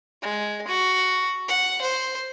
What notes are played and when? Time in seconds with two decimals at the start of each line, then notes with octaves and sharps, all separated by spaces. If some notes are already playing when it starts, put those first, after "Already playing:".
0.22 G#3
0.68 F#4
1.48 F#5
1.81 C5